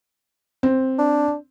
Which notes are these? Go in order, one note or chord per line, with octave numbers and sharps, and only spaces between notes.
C4
D4